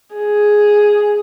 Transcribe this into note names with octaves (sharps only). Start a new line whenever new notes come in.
G#4